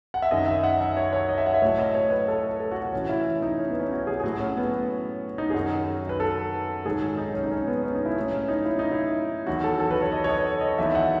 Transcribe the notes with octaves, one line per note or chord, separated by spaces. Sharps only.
F#5
E5
F#2 D#3 F#3 D#5
E5
F#5
E5
C#5
C#5
D#5
E5
F#5
E5
A2 F#3 C#5
D#5
C#5
B4
A4
A4
F#4
F#4
A2 E3 C#4
E4
D#4
C#4
B3
C#4
F#4
G#4
G#4
A2 F#3 F#4
C#4
B3
D#4
G#4
F#2 D#3 F#3 F#4
B4
A4
G#2 D#3 F#3 G#4
D#4
C#4
D#4
C#4
B3
C#4
D#4
E4
A2 F#3 C#4
C#4
D#4
E4
D#4
E4
E2 D#3 F#3 F#4
A4
A4
B4
C#5
D#5
C#5
D#5
D#5
E2 D#3 F#3 E5
E5
F#5